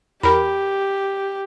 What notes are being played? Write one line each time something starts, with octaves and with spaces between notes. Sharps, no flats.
E2 G4 A#4 B5